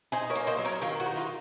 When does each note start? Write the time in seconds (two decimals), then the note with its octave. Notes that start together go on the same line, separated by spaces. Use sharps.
0.12 D#4 G#4 C5
0.30 A#4 C#5
0.35 A#3
0.47 C5 D#5
0.58 F#3
0.65 A#4 C#5
0.82 D#3 F4
1.00 F#4
1.06 D#4
1.17 F4